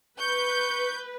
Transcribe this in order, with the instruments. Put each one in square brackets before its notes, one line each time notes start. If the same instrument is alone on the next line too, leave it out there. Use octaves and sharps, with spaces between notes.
[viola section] B4 [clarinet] C#6 [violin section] G6